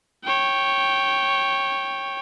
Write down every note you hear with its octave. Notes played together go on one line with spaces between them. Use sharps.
C#5 G5